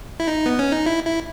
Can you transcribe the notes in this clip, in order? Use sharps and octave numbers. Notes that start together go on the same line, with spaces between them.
E4
D#4
B3
C#4
D#4
E4
E4